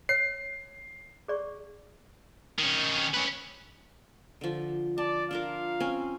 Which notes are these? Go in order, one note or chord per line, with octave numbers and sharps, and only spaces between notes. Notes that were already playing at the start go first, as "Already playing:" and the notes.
C#5 C7
G#4 D5 C#6
D#3 C#4
C#4 B4
D3 F3
D5 A5
D4 F4 A#4 F5
C4 C#4 G#5